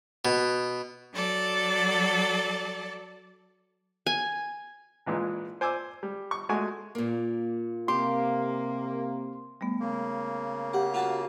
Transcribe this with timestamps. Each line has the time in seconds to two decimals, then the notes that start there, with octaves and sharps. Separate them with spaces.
0.25 B2
1.12 F#3 A4 D5
4.06 G#5
5.06 A#1 A#2 E3 G#3
5.61 C5 G#5 D6 E6
6.03 G3
6.31 C#6
6.49 G#3 A3 F#4 G#5 C#6
6.95 A#2 A#3
7.88 C3 A#3 G4 C6
9.61 G3 A3 B3
9.80 C#3 A#3
10.74 G4 F#5
10.94 F4 F#4 A5